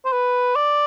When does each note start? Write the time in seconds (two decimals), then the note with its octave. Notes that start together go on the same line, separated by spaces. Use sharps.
0.05 C5
0.13 B4
0.55 D5